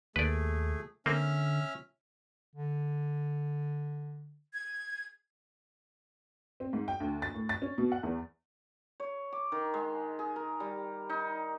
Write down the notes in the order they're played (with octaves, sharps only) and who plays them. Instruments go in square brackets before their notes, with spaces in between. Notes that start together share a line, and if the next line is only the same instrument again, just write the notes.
[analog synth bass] D#2 [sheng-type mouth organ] A3 G#4 [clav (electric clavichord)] B4 D5
[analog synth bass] D3 [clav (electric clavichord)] A#3 C4 [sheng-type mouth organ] C#4 E5 F6
[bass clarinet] D3
[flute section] G#6
[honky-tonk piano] C4
G#2
G5
D2
A6
A2
A6
C#4
B2
F#5
E2
[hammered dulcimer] C#5
D6
D#3
G#3
G#4
A#4
G3
D#4